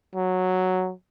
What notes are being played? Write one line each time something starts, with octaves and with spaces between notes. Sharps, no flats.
F#3